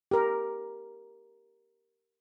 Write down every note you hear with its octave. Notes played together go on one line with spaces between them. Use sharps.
G4 A#4